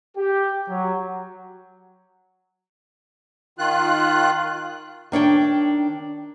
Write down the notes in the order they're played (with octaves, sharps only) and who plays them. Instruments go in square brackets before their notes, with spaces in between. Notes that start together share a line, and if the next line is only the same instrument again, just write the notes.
[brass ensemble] G4
F#3
[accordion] D#3 F4 F#6
[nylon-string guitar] D#3 D4 C#5 G5